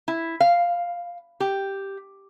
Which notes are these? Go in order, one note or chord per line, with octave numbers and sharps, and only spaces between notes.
E4
F5
G4